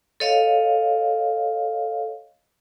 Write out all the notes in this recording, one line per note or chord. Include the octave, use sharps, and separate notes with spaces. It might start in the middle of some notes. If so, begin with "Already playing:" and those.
A4 C#5 D#5 F5